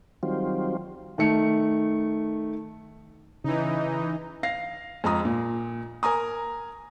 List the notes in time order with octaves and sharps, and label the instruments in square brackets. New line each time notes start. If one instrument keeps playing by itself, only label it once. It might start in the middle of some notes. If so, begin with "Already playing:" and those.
[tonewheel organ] D#3 F#3 G3 C4 F4
[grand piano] D#3 A3 C#7
[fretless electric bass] C#3 [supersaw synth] E3 D#4
[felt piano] F5 A#6 C7
F2 G#3 G#4 A#5 D#6
A#2
A#4 G#5 A#5 D#6